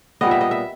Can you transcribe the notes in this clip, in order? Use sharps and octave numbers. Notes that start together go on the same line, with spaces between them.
A#2 G3 B3 D#5
E5
D#5
E5